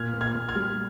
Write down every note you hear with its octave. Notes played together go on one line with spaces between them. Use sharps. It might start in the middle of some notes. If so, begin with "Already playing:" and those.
Already playing: A#2 F6 G#6
A#2
F6 G#6
A#2
F6 G#6
G3